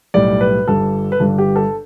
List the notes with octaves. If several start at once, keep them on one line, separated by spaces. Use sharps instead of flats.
B1 A2 G3 D5
B4
G1 G2 G3 A4
B4
G1 G2 G3 A4
G4
A4